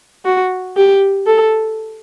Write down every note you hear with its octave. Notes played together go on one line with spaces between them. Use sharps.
F#4
G4
A4